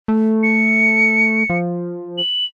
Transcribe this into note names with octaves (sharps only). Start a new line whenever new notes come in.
A3
C#7
F3
F#7